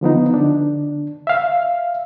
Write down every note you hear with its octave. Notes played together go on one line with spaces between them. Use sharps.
D3 F3 B3 D#4
D3 D4
E5 F5